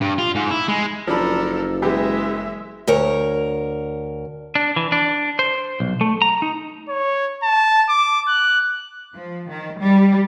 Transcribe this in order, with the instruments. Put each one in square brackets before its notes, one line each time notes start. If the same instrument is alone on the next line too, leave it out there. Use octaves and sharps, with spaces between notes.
[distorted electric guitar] G2
F4
G#2
E4
G#3
[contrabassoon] F#1 [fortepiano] F3 D4 B5 [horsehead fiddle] A4 A#4
[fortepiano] E3 B3 G4 [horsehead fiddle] G#3 E5
[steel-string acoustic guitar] D2 A#4 C#5
[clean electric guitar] D4
E3
D4
C5
B1
A3
A#5
D#4
[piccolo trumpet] C#5
A5
D6
F#6
[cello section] F3
D#3
G3